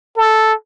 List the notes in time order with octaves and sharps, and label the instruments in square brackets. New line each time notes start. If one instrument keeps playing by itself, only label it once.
[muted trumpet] A4